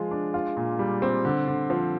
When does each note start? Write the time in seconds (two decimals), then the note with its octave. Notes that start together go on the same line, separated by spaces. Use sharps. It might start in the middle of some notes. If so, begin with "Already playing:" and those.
Already playing: F3 G#3 F4
0.11 D4
0.34 F4
0.57 A#2
0.79 G3
1.02 C4
1.25 D3
1.47 D3
1.70 F3